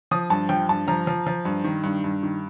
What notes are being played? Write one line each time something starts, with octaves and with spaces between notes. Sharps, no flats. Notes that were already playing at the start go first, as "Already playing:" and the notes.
F3 D#6
G2 A5
F3 G5
G2 A5
F3 A#5
F3
F3
G2
D#3
G2
G2
D#3